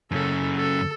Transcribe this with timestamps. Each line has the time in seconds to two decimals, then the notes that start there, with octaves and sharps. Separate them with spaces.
0.11 F#2 C#3 A4
0.57 A4